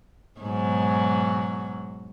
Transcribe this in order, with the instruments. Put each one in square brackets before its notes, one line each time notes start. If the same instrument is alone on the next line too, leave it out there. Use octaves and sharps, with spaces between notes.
[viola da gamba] G#2 B2 F#3